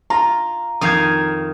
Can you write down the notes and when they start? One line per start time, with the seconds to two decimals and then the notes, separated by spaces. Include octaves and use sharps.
0.10 F4 A#5
0.81 F2 D#3 F5 D#6 G#6